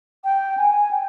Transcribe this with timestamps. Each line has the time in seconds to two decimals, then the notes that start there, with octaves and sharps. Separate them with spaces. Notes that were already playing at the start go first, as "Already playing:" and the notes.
0.24 G5
0.57 G#5
0.91 G5